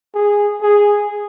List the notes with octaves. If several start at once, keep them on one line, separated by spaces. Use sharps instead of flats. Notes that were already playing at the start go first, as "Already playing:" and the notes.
G#4
G#4